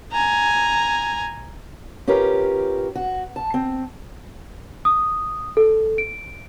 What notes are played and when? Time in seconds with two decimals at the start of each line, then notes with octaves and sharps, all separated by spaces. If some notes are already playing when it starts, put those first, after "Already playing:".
0.12 G#5 A#5
2.07 C#4 F4 G4 A#4 B4
2.95 F#4
3.36 A5
3.54 C4
4.85 D#6
5.57 A4
5.98 D7